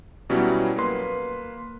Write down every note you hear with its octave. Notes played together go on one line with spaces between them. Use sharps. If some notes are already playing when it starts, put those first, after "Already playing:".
B2 F#3 G3 C#4 E4
A#3 B4 C6